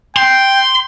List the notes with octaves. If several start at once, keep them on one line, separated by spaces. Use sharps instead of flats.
G5 C6